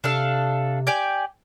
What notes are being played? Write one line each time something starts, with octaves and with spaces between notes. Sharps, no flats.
C3 D4 A4 F5
G4 D5 G#5